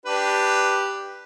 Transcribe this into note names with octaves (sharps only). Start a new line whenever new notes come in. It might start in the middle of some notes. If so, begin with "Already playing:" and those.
D4 G4 B4